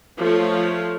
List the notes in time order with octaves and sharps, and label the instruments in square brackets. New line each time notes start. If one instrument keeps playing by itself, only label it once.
[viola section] F3 A3 F4 C#5